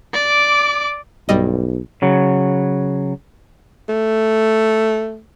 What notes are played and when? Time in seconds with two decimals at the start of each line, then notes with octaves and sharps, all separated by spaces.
0.14 D5 D6
1.29 B1 G2 G3 D#5
2.02 C#3 F#3
3.89 A3